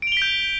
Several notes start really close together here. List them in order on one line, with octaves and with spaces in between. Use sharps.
D7 F7 G7 B6 G6